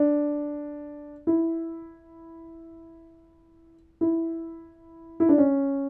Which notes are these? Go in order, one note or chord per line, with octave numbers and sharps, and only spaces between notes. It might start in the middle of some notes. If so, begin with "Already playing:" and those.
Already playing: D4
E4
E4
E4
D4
C#4